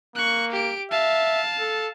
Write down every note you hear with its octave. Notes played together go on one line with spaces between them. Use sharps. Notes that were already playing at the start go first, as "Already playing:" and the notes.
A#3 C#6 F#6
G4 D7
E5 F5 A5
A4